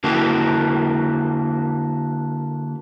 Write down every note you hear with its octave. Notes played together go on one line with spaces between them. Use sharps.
D3 A#3 E4 F#4 G4